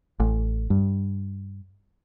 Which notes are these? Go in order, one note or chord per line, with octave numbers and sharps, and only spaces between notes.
A1
G2